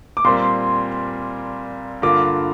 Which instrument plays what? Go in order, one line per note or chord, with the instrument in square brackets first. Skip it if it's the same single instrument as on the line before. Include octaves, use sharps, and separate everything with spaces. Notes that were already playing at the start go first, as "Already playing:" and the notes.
[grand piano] D6
[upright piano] A#2 G3 C4 A#4 [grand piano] C6
[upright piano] G2 D3 A#3 F4 [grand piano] D6